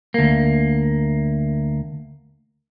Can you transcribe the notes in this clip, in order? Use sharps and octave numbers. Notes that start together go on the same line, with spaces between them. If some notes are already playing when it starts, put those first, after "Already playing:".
D2 A#3